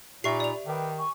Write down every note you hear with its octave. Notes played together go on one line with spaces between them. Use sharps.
A#2 D#4 G4 E5 B5 C#6 C7
D5 F7
D#3 B4 G5 D6
G#5 C#6